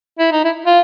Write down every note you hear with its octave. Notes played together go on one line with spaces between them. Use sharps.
E4
D#4
E4
F4